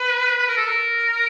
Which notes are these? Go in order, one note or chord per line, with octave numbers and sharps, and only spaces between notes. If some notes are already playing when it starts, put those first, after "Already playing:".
Already playing: B4
B4
A#4
A4
A#4